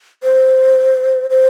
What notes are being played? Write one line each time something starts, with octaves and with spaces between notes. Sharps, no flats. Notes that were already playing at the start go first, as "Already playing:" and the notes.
C5
C5